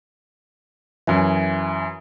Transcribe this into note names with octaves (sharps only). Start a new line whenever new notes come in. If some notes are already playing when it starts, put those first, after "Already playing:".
F#2 E3 E5 G#5